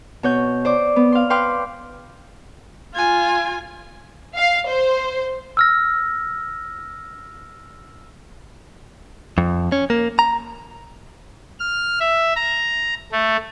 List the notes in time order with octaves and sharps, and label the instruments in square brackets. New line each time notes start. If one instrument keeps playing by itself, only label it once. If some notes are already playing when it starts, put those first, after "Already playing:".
[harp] B2 C#5 G6
C5 D5 D6
B3
F5 C6
B4 G5 C6 D6 F6
[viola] F4 G#5
[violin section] F5
C5
[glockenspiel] E6 F6 A#6
[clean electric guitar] F2
C#4
A#3
A#5
[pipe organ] F6
E5
A#5
A3